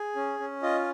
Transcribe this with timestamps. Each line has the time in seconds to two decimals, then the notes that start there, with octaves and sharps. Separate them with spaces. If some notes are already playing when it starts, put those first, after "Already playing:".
Already playing: G#4
0.16 C#4
0.39 C#4
0.63 F4 D#5